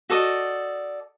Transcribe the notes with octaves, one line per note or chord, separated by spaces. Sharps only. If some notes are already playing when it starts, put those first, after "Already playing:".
F#4 A4 D5 D#5